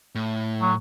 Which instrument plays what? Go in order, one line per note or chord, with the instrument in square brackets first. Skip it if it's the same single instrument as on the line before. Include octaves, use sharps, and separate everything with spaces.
[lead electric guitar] A2
[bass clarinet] F#3